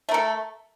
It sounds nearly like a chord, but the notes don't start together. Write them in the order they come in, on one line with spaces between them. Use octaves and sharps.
A3 A#4 A4